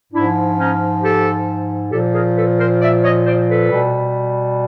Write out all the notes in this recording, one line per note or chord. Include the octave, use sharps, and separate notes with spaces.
G#2 F3 D4 E4
C#4 D#4
G4 A4
A#2 F3 G4 A4
G#4 A#4
A4 B4
A#4 C5
D5 E5
C#5 D#5
C5 D5
A4 B4
B2 G3